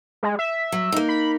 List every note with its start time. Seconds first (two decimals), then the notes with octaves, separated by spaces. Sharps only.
0.23 G#3
0.39 E5
0.72 F#3
0.92 A#3 D#4
1.09 B5